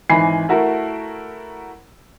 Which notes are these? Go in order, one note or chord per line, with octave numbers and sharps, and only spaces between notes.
G#1 E3 D#4 G#5 B5 C7
A3 E4 F#4 A#4